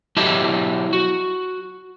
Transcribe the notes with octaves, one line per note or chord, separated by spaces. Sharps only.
F#3 E4 G4 D#5 E5 A5
F#4